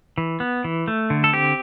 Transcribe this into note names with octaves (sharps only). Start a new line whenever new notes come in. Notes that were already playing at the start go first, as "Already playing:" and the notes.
E3
B3
E3
A3
D3
A4
C4 G4